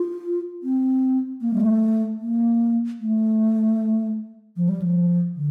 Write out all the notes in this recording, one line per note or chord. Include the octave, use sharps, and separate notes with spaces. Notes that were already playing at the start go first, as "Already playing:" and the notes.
Already playing: F4
C4
A#3
G3
A3
A#3
A3
F3
G3
F3
D3